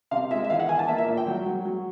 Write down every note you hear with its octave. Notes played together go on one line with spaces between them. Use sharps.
C3 F5
G#3 E5
E5
E3 F5
F#5
E3 G#5
A5
A#3 E5
E5
A#2
G5
F#3
F#3
F#3